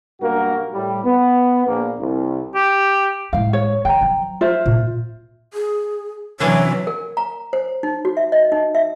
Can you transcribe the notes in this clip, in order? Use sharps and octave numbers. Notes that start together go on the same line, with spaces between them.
B1 G2 A#3 F#4 A#4
A2 G3
B3
A#1 A#3
C2
G4
A2 G#3 F5
C#5
D#3 G5 A#5
F3 F#3
F4 C5 E5
A#2
G#4
C3 E3 F#3 C#4 D4 C#5
A#4
A#5
C5
D#4
F#4
E5
D#5
D#4
E5